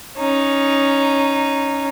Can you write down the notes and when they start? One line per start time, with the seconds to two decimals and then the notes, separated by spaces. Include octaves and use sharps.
0.18 C#4 D#4